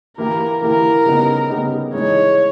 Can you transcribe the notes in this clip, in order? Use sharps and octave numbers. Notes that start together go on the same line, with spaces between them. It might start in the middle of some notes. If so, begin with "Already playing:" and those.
E3 A#3 E4 G4 A#4
E3 A#3 E4 G4 A#4
C#3 G3 B3 D#4
C#3 G3 B3 D#4
E3 G#3 D#4 C#5